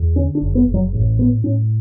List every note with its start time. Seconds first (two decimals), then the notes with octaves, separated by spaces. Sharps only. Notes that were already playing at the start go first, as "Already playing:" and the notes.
Already playing: E2
0.16 D3 C#4
0.35 D4
0.41 F#1
0.55 B3
0.67 F#1
0.74 F#3
0.93 A1
1.19 A2 B3
1.44 A2 C#4